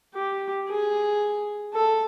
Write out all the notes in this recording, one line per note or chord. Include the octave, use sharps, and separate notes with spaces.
G4
G#4
A4